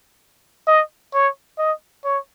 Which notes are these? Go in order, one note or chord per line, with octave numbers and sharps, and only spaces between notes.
D#5
C#5
D#5
C#5